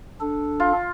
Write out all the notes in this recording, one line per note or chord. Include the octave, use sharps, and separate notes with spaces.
D4 A4
F4